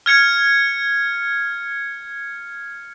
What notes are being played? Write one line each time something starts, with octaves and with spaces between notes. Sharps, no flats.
F6 G#6 C#7